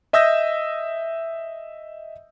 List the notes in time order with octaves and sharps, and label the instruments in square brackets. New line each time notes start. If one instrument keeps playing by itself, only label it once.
[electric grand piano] D#5 E5 D#6 E6 G6 A#6